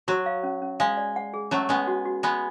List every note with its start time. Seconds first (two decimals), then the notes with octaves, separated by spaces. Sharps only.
0.08 F#3 F#4
0.26 F5
0.43 C#4
0.62 C#4
0.80 G#3 F5
0.97 D5
1.16 F#5
1.34 G#4
1.51 F#3 A3 C#4
1.69 G#3 B3 C#4
1.87 F#4
2.05 F#4
2.23 G#3 B3 B5